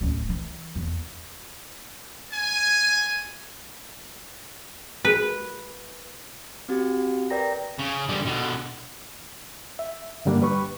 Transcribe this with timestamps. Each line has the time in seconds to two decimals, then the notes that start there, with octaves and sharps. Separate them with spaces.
0.01 D1 C#4
0.29 E3
0.76 E2
2.31 G#5
5.05 B4
6.69 C4 F#4 G4
7.30 A#4 B4 D5 G5 A#5 A#6
7.78 C#3
8.09 D3 G3
8.26 B2 D3
9.79 E5
10.25 G2 D3 G3 A#3 D4
10.42 G3 B4 B5 C#6